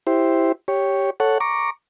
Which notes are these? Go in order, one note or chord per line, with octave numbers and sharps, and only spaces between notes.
E4 G4 C5
G4 C#5
A4 C#5 F#5
A#5 C#6 D6